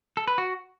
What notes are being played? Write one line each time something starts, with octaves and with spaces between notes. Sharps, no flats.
A4
B4
F#4